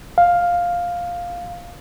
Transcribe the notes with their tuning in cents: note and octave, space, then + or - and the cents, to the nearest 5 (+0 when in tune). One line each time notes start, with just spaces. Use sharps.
F5 +5